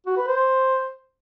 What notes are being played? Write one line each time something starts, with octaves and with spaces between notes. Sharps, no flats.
F#4
B4
C5